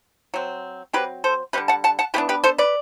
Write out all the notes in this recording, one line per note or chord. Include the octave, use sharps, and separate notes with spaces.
F#3 C4
F#3 C4 G4 B4
A4 C5
D3 G3 C4 G4 B4
F#5 A5
F#5 A5
F#5 A5
E3 B3 D4 G4 B4
G4 B4
A4 C5
B4 D5